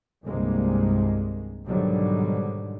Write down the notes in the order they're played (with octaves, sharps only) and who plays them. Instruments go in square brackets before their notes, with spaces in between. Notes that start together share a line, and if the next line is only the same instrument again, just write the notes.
[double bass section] C2 G2 D#3 G#3 A#3
G#2 B2 D3 D#3 F#3 G3